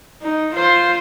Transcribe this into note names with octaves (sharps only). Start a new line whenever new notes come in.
D#4
F4 C5